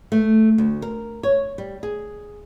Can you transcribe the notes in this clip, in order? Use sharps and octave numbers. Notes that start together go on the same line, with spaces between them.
A3
D2
A#4
C#5
G3
G#4